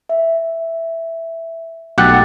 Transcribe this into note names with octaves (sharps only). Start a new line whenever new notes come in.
E5
B1 A3 G4 F#5 A6